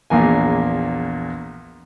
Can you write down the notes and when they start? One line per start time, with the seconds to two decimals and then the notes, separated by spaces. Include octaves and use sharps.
0.10 A#1 E2 A#3 G#5